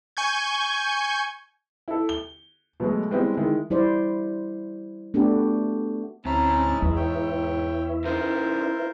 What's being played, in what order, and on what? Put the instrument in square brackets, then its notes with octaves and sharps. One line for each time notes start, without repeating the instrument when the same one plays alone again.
[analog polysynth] G#5 C#6 G6 G#6
[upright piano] E4 A4
G7
B2 F#3 G#3 A3
G3 G#3 B3 C4 E4 G4
D#3 G#3 E4
[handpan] G3 E4 C5 D5
A3 B3 D4 F#4 G4
[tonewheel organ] D2 C4 [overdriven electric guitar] G#2 A#5 [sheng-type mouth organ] C#4 E4 A5
[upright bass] E2 [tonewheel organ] E4 B4 E5
[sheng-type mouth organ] C#5 G5
[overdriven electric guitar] C#3 D#4 [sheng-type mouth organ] F4 A#4 C5